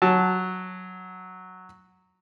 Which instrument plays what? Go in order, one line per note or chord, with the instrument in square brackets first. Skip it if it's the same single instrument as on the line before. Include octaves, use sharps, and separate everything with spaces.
[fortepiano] F#3 A5